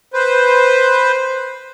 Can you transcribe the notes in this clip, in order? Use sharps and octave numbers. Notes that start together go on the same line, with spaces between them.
B4 C5